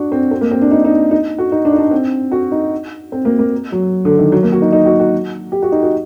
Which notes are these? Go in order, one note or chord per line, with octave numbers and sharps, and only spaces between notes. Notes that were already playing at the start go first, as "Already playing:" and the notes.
Already playing: D4 F#4
C4
C4
A#3
C4
D4
D#4
D#4
D#4
F#4
D#4
D4
D#4
D4
C4
F#4
D#4
C4
A#3
A#3
F#3
D3
D#3
F#3
A#3
F#4
D#4
D#4
F#4
F#4
G4
F#4
D#4
F#4